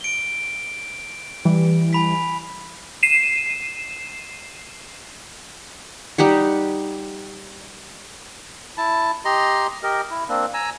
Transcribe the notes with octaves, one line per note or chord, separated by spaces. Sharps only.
D7 G7
E3 G3
G#5 B5 B6
C7 D#7 E7
G3 D#4 G4 F#5
E4 A5
G4 D#5 A#5 C6
G4 A#4 D#5
E4
A#3 C4 D4
G#5 A#5 E6